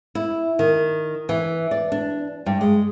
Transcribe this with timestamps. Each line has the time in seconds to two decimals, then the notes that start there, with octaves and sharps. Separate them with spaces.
0.15 E4
0.59 D#3
1.29 E3
1.71 D5
1.92 D4
2.46 G2
2.61 G#3